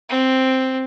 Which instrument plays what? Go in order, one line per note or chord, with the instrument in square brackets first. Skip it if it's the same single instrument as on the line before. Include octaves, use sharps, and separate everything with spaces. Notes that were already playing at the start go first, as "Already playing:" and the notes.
[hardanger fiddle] C4